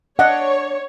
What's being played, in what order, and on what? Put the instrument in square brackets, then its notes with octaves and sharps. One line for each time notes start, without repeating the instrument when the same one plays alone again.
[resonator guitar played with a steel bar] D4 D#5 [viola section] C#5 [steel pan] F#5